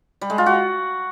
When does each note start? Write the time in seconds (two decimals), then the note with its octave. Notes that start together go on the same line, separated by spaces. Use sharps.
0.21 G3
0.30 G#3
0.38 F4
0.46 F#4